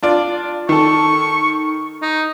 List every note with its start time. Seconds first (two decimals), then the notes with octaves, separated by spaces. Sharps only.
0.03 D4 F4 D5
0.69 D#3 A4 C#6
2.02 D#4